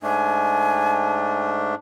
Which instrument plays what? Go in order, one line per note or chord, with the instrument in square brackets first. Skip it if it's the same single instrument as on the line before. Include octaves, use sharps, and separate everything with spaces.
[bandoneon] G#2 A3 D4 [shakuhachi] G#5